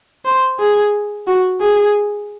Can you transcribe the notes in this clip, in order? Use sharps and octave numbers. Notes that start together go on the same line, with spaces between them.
C5
G#4
F#4
G#4